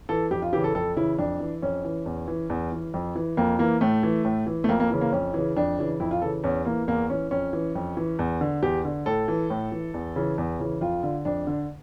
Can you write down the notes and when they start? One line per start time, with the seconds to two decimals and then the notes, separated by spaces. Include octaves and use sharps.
0.09 E3 A4
0.31 F2 G4
0.42 F4
0.53 C#3 E3 G4
0.64 A4
0.75 F2 A4
0.96 C#3 E3 E4
1.18 F2 D4
1.40 E3
1.62 F2 C#4
1.85 E3
2.06 E2
2.28 E3
2.50 E2
2.72 E3
2.94 F2
3.15 E3
3.37 F2 A#3
3.59 E3 A#3
3.81 A2 A3
4.03 E3
4.25 A2
4.47 E3
4.64 A3
4.69 F2 A#3
4.80 A#3
4.90 C#3 E3
5.01 A#3
5.12 F2 C#4
5.34 C#3 E3
5.56 F2 D4
5.78 C#3 E3
6.00 F2 E4
6.11 F4
6.22 C#3 E3 A4
6.44 E2 C#4
6.65 E3 A#3
6.87 E2 A#3
7.10 E3 C#4
7.31 F2 C#4
7.53 E3
7.75 F2
7.97 E3
8.19 E2
8.41 D3
8.62 E2 G4
8.85 D3
9.06 A2 A4
9.28 E3
9.50 A2
9.72 E3
9.94 E2
10.16 C#3 E3
10.38 E2
10.59 C#3 E3
10.81 F2 F4
11.03 D3
11.25 F2 D4
11.47 D3